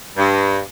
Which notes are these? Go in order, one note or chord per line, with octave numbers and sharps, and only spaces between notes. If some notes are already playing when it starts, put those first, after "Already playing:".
G2